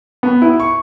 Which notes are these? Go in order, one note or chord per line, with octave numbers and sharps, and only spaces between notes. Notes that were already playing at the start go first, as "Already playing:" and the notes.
B3
E4
C#6